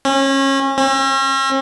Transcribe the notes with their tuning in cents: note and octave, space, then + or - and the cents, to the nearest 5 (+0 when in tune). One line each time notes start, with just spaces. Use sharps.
C#4 -30
C#4 -45